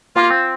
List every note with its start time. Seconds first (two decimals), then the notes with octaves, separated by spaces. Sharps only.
0.16 A#3 F4
0.30 C4